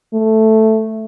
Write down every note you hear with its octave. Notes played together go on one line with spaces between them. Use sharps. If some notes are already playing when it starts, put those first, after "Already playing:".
A3